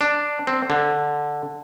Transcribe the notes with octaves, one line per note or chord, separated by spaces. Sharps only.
D4
C4
D3